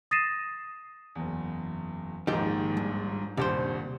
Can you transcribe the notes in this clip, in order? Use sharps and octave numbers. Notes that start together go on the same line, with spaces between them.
D#6 A6 A#6 C7 D#7 E7
F#1 E2
A#1 D#2 G#2 D#3 G4
G2
D#1 G2 C3 G4 C5